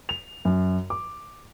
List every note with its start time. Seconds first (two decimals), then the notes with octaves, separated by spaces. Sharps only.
0.09 F7
0.45 F#2
0.90 D6